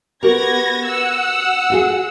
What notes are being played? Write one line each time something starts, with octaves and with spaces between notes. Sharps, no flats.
B3 F#4 G4 A#4 G#6 A#6
F#5 E6
F4 F#4 G#4